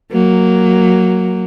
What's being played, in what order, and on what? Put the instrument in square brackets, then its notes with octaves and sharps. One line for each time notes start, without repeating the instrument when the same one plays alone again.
[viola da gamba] F#3 A#3